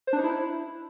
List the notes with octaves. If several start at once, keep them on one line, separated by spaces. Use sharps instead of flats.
C5
D4
D#4
E4